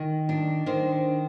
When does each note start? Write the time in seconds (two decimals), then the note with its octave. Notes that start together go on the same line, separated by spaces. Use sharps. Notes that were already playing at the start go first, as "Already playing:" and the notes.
Already playing: D#3
0.29 D4
0.66 D#3 C5